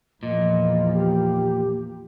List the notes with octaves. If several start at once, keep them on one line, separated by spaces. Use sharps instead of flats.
E2 A#2 F3 D#5
G4